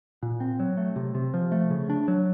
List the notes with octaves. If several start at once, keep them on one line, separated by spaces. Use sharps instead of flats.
A#2
C4
F#3
A3
C3
C3
F3
A3
C#3
D4
F#3